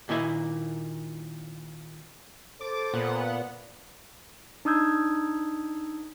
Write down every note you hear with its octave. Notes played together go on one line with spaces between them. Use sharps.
A#2 D#3 A#3 E4 D#5 G#5
A4 C5 D6 A6
A#2 B3 F#5
D4 D#4 D#6 E6 G6 G#6